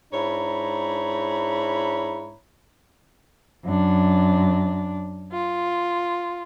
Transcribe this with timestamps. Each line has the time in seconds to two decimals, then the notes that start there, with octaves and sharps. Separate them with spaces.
0.13 G#2 D4 E4 C#5 A#5 B5
3.64 F#2 D4
5.30 F4